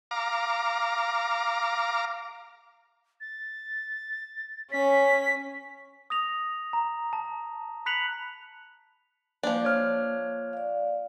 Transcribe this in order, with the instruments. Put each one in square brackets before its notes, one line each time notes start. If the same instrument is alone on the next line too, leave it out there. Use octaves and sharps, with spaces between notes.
[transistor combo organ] F5 A#5 D6
[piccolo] A6
[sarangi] C#4 [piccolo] B6
[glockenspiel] D#6 A#6 F7
A#5
A5
B5 F#6 B6 C#7 F7 F#7
[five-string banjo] F3 D4 [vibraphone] A#3
[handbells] C#5 F6
[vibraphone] D5 F5